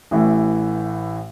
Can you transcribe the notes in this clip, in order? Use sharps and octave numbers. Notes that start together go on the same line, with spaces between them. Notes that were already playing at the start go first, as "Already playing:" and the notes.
A1 A2 E3